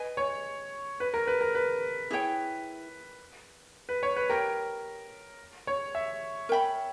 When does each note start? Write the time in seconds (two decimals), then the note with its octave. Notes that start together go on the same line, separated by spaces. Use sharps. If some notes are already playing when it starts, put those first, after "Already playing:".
Already playing: B4 D#5 G#5
0.17 C#5
1.00 B4
1.14 A#4
1.27 B4
1.41 A#4
1.55 B4
2.11 E4 G#4 C#5 G5
3.89 B4
4.03 C#5
4.16 B4
4.29 G4 A#4 C#5 G5 B5
5.67 C#5
5.95 E5
6.49 A#4 E5 G5 B5